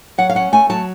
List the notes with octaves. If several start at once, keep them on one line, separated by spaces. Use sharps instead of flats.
F#3 F#5
F5
C#4 F#5
A3 G#5
F#3 A5